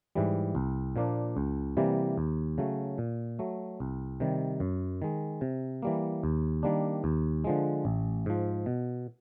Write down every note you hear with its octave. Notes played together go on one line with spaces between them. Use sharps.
G#2 E3 G3
C2
A#2 F3 A#3 D4
C#2
C3 E3 G3 A#3
D#2
C#3 F#3 A3
A#2
F#3 A3
C2
C3 D#3 G3
F#2
D#3 G#3
C3
E3 G3 A#3
D#2
D#3 G3 A#3 D4
D#2
D3 F3 G#3
A1
G#2 F3
B2